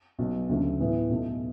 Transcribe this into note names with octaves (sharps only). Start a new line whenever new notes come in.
B1 B2 F#3
D2 C#3 F#3 A3
A2 E3 B3 E4
B1 B2 A3